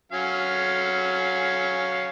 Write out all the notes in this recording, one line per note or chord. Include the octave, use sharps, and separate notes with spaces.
F#3 C#4 F5